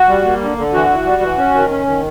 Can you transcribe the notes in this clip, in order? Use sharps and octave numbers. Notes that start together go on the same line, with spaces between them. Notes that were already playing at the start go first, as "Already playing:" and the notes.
Already playing: F#4
G3
A#3
D3
D3
E3 F#4
E3
G3
E3
C#4
D#3
C#4
D#3